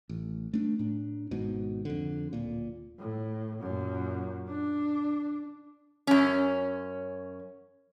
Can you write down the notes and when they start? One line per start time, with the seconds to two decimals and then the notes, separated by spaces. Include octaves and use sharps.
0.09 A1
0.53 A3 D4
0.79 A2 D4
1.31 G#1 G#2 B2
1.85 F2 D3
2.33 D1 A#2
2.99 A2
3.60 F#2 A#2
4.49 D4
6.07 F#2 C#4